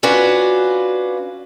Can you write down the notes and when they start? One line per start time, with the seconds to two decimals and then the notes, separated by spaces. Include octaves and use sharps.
0.03 C#4 D4 F4 F#4 B4